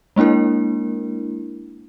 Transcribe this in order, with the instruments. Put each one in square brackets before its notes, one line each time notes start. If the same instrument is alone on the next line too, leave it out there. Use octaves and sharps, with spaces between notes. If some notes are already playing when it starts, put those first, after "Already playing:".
[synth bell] G#3 A#3 D4 E4 A#4